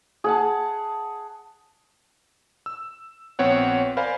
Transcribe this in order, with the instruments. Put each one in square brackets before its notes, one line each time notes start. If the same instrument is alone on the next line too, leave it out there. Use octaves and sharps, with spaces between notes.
[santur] G#4 F#5 A5
[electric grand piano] E6
A#1 B3 C4 C#5 F#5
A#4 C5 D5 F5 G#5 B5